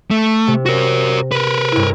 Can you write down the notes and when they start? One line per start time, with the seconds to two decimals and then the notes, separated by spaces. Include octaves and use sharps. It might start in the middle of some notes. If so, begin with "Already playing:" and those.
0.11 A3
0.47 C3
0.66 F#4 A#4 A#6
1.32 A#4 B4
1.72 G2 E4